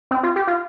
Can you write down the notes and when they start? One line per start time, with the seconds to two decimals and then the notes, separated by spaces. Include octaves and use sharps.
0.11 C4
0.23 F4
0.36 G4
0.47 F4